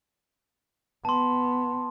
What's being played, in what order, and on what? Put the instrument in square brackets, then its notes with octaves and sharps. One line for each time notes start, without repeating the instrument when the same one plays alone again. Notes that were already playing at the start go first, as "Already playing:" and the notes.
[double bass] B3 [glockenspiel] A5 C6